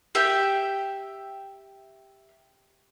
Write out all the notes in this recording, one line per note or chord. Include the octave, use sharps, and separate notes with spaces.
G4 E5 G5